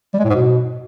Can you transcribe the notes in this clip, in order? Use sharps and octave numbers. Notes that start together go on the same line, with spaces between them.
G3
G#3
A2
G#2
B2